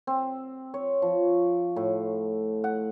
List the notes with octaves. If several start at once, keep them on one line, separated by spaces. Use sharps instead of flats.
C4
C#5
F3
A2
F#5